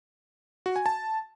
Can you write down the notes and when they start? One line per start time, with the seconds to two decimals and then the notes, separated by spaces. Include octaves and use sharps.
0.66 F#4
0.76 G#5
0.86 A5